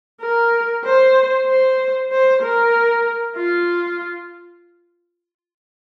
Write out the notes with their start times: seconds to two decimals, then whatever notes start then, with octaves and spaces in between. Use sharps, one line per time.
0.21 A#4
0.84 C5
1.47 C5
2.11 C5
2.42 A#4
3.37 F4